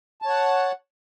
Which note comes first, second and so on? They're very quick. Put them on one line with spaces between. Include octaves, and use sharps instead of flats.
A5 C#5 F#5